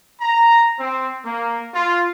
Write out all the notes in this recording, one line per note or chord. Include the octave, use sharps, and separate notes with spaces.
A#5
C4
A#3
F4